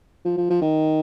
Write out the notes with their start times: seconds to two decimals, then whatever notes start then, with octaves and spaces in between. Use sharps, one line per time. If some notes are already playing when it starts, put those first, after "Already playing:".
0.25 F3
0.37 F3
0.50 F3
0.61 D#3